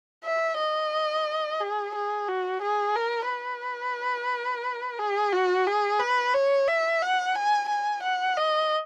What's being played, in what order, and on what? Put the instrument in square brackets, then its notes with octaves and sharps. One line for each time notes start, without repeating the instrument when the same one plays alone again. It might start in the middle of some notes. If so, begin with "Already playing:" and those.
[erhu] E5
D#5
G#4
G#4
F#4
G#4
A#4
B4
G#4
F#4
G#4
B4
C#5
E5
F#5
G#5
G#5
F#5
D#5